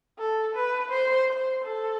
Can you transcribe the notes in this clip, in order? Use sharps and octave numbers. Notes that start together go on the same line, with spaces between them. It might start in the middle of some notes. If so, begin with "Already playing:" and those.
A4
B4
C5
C5
A4